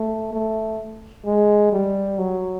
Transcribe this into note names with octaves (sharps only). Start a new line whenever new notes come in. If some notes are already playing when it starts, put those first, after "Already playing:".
Already playing: A3
A3
G#3
G3
F#3